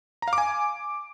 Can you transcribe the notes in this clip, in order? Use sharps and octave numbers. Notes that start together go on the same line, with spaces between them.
A#5
F5
D6
G#5